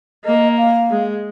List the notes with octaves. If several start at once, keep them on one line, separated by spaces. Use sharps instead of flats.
A#3 D#5
F5
G#3